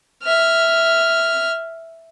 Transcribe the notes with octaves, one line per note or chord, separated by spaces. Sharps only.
E5 F6